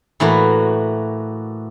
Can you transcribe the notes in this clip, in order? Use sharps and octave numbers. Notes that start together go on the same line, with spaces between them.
A2 E3 A#3 F#4